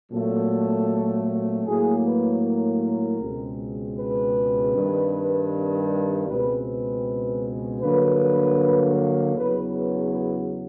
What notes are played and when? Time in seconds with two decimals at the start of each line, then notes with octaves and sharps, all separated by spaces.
0.12 A#2 F#3 A3 C4 A4
1.66 A2 F#3 A#3 G#4
2.05 B4
2.43 A#4
3.20 C#2 B2 G#3 C4
3.97 B4
4.74 G2 D#3 G3 C4
6.27 C#2 B2 G#3 C4 B4
6.66 B4
7.80 G2 D3 F#3 A#3 B4
9.35 E2 C#3 F#3 B4
9.73 B4
10.12 B4